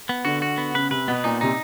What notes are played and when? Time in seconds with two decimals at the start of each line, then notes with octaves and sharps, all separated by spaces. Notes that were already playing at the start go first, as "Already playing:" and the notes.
0.09 B3
0.25 D3 F#4
0.42 F#4
0.58 B3
0.74 C#3 B4
0.91 C3 B4
1.08 B2 B3
1.24 A#2 D#4
1.41 C3 D#4